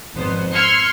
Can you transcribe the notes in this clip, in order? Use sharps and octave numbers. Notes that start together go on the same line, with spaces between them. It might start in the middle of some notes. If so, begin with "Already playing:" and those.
G#1 F2 B3 C5
C6 E6 F6 G#6 C7 C#7